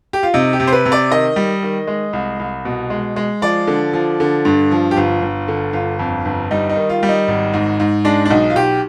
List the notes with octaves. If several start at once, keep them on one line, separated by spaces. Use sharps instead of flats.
G4
F4
C3 D#4
G4
C3
C5
B4
C3
D5
D#3 D#5
G3
D#3
G#3
C2
C2
B2
G#3
G#3
F3 D5
D3
F3
D3
G2
F3
G4
G1 F4
G1
D3
G1 F4
F2
G1
G3 D#4
D#4
D#3
F4
G3
D#4
G#1
G#2
G#2
G#3 D4
D4
B1 D#4
F4
B1 G4